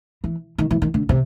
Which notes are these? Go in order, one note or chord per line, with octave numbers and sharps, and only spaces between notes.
E3
D#3
E3
D#3
D3
C3